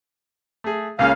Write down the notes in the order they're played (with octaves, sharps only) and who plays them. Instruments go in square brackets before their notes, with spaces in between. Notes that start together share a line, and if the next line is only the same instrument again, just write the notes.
[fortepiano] A3 G#4
[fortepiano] C#2 A#3 C#4 [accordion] C#3 F5